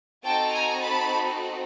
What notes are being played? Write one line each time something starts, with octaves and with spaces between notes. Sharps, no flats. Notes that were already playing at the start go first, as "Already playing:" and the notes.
C4 D#4 F#4 A4 G5 A5
G#5 A#5
A5 B5